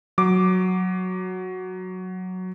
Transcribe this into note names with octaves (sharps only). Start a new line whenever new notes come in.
F#3 D6